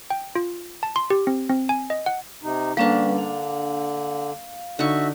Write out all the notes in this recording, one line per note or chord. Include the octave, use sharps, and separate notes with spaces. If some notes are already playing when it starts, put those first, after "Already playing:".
G5
F4
A5
C6
G4
C4
C4
G#5
D#5
F#5
C3 D#4
D3 G3 A#3 C#4 D4 B4
F5
D3 D#4 F#4 E5 C#6